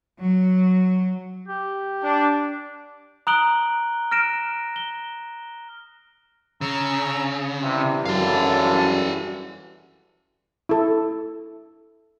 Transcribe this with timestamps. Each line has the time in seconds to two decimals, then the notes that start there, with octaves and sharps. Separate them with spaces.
0.20 F#3
1.48 G4
2.04 D4
3.27 A#5 D#6 F#6 D7 F#7 G7
4.11 F6 A#6 D7 E7
4.76 G7
6.61 C#3 A#5 C#6 E6
7.62 C3 E3 G3
8.06 G#1 F#2 D3 F#4 A4 F5
10.69 E4 A4